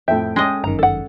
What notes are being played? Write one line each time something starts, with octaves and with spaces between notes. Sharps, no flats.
F2 A2 A4 E5 G5
G#3 C#4 D#5
G1 F#2 D#3 A#5
A4 F#5